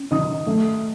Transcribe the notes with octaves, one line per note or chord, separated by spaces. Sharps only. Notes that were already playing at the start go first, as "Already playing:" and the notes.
Already playing: C#4
D#3 D#5 D#6
A3